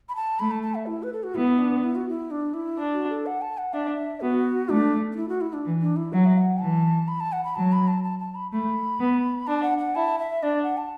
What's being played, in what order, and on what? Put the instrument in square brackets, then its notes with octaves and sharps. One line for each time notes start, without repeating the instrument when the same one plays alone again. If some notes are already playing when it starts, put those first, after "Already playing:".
[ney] B5
A5
[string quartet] A3 [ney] B5
[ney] A5
A5
E5
E4
B4
A4
F#4
[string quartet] B3 [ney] E4
[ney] D4
E4
F#4
E4
D4
E4
[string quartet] D4
[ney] F#4
A4
F#5
A5
F#5
[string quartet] D4 [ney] E5
[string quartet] B3 [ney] F#4
[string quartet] A3 [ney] D4
[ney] D4
E4
F#4
E4
D4
[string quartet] E3
[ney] D4
E4
[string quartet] F#3 [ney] F#5
[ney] E5
F#5
[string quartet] E3 [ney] A5
[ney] B5
A5
F#5
B5
[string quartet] F#3 [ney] A5
[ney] B5
A5
A5
A5
B5
[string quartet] A3 [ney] B5
[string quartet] B3
[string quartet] D4 [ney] A5
[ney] F#5
F#5
[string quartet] E4 [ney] A5
[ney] E5
[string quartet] D4 [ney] D5
[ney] F#5
A5